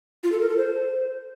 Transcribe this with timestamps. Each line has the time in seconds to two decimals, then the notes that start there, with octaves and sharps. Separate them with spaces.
0.24 F4
0.32 A4
0.41 A#4
0.49 A4
0.58 C5